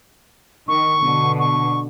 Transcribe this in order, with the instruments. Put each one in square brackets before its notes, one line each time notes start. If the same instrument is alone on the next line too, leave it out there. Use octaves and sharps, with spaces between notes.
[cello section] D#3 [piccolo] C#6
[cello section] B2 D3
[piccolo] C#6